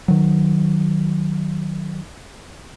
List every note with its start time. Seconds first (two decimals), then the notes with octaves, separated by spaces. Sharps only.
0.08 D#3 F#3